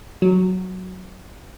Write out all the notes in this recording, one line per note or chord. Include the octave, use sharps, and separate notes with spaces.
F#3